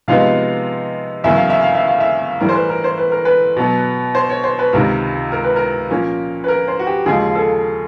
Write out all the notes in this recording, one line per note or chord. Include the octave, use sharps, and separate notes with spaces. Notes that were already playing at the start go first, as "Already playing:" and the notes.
C3 F3 G#3 B3 D#4 F5
E2 C#3 F#3 A#3 E5
F5
E5
F5
E5
F5
E5
A2 E3 G3 A#4
C5
B4
A#4
C5
B4
A#4
B4
B2 F#3 B3
C5
C#5
C5
B4
C#2 C3 D#3 A#4
A#4
B4
A#4
A#2 F3 A#3 C#4
B4
A#4
C5
F#4
G4
D#2 C#3 F3 G#3 G#4
A4